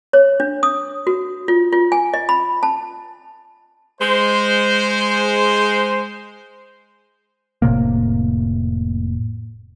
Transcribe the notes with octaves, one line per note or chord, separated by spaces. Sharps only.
C#5
D4
D#6
F#4
F4
F4
G#5
D#5
B5
A5
G#3 C5
F1 A2 C3 A#3